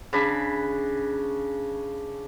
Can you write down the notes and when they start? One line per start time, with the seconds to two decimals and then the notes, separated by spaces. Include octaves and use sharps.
0.13 C#3 D4 B5